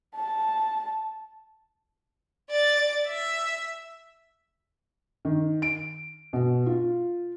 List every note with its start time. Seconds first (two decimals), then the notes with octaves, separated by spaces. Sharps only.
0.15 A5
2.50 D5 A6
3.07 E5
5.25 D#3
5.62 D7
6.33 B2
6.66 F4